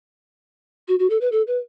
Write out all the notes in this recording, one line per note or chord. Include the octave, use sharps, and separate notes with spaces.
F#4
F#4
A4
B4
A4
B4